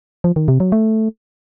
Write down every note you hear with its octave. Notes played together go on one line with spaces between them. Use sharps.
F3
D#3
C3
F#3
A3